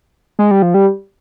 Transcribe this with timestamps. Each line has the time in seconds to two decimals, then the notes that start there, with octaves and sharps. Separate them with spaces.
0.39 G#3
0.51 G3
0.62 F3
0.74 G3